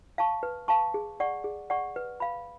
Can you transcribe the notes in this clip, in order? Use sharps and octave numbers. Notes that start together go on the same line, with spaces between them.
F5 A5 C#6
B4
F5 A5 C#6
G#4
D5 F#5 C#6
G#4
D5 F#5 C#6
B4
F5 B5